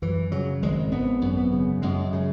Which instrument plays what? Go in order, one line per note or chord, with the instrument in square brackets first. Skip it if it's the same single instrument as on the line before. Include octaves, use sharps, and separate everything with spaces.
[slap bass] F#2 E3
C#3 F#3
G#1 G#3
G#1 B3
F#2
B3
C#3
F#2 G#3
C#3